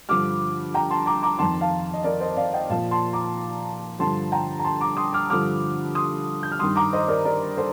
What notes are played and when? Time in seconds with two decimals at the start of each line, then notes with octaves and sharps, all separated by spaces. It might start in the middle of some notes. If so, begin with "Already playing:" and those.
0.09 G2 D3 F3 D6 F6
0.74 G5 A#5
0.90 A5 C6
1.06 A#5 D6
1.23 A#5 D6
1.39 F2 D#3 A5 C6
1.61 F5 A5
1.93 D#5
2.04 A#4 D5
2.20 C5 D#5
2.37 D5 F5
2.53 D#5 G5
2.69 A#2 F3 F5 A5
2.91 A5 C6
3.13 A#5 D6
3.99 G2 D3 F3 A5 C6
4.32 G5 A#5
4.59 A#5
4.64 A5 C6
4.81 A#5 D6
4.97 C6 D#6
5.13 D6 F6
5.30 G2 D3 F3 D6 F6
5.95 C6 D#6
6.43 G6
6.52 F6
6.59 G2 D#3 C6 D#6
6.76 A#5 D6
6.93 C5 D#5
7.08 A#4 D5
7.25 A#4 D5
7.57 A4 C5